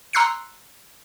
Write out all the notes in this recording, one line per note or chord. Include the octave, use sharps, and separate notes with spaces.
A#5 C6 E6 F#6 C7 C#7